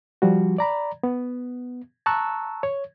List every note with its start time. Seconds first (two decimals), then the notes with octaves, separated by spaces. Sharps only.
0.22 F3 G3 F#4
0.58 D5 A#5 B5
1.03 B3
2.06 A5 A#5 C#6 E6 F#6
2.63 C#5